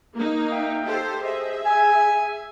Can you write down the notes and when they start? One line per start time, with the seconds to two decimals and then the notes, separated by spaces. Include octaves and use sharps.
0.15 A#3 D#4
0.51 E5 F5 G5
0.84 G4 A4 C5
1.23 G#4 C5 D#5 E5
1.66 G#5